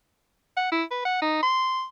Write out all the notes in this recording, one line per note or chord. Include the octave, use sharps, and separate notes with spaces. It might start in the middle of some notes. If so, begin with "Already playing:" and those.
F#5
E4
B4
F#5
D#4
C6